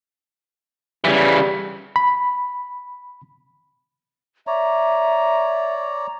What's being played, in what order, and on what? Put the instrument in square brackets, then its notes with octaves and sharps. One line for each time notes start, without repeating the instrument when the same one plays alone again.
[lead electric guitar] C#3 E3 [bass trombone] G3
[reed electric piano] B5
[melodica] C#5 D5 A#5 [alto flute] E5